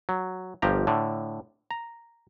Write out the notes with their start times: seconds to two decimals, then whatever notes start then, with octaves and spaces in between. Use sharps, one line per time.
0.09 F#3
0.62 G1 F3 G4 A#5
0.87 A2 D3
1.71 A#5